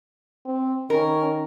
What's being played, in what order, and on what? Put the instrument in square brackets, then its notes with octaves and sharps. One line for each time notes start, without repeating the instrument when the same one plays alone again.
[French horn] C4
[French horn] D#3 [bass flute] C#4 [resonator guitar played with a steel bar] A#4